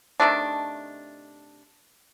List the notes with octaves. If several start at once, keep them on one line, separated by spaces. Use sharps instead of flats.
C3 D#3 A3 D4